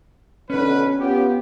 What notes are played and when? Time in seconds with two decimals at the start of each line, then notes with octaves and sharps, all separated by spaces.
0.50 B1 D3 C#4 B4
0.98 B3 F4 G4